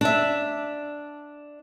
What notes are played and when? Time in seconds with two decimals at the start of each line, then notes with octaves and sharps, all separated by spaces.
0.01 D4 E5